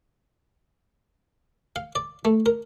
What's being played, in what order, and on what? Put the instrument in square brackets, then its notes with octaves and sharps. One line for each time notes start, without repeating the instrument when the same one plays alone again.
[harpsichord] F5
D5
A3
A#4